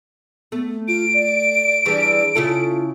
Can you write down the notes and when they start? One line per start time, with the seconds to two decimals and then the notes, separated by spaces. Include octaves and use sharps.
0.52 A3 B3
0.88 F4 D7
1.14 D5
1.85 E3 G3 D4 G#4
2.35 C#3 E4 F4 A4